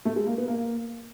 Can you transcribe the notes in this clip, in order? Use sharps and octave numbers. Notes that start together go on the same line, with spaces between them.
A3
G#3
A#3
B3
A#3